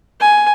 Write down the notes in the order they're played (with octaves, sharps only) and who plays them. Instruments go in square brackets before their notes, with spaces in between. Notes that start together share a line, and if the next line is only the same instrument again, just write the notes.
[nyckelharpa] G#5